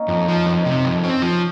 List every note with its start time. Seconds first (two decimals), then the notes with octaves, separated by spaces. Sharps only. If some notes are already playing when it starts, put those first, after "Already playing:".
Already playing: A#3 C#4 D#4
0.08 F2
0.28 F3
0.46 F2 D#4
0.65 C3
0.85 F2
1.04 C4 C#4
1.22 F3